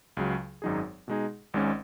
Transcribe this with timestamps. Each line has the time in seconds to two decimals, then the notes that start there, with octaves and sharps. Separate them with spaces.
0.17 C#2 C#3 F#3
0.62 G#1 F#2 F#3 D#4 G#4
1.08 B2 G#3 D#4 G#4
1.54 G#1 G#2 G#3 C#4